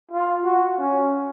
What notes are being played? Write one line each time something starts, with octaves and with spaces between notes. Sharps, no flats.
F4
F#4
C#4